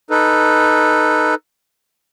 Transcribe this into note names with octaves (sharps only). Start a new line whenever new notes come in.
D#4 A4 B4